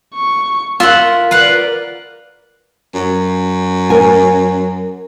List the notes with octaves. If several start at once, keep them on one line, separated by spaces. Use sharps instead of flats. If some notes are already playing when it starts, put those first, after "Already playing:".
C#6
F4 A#4 E5 F#5
A#4 B4 D5 F5 F#5
F#2
A#4 G#5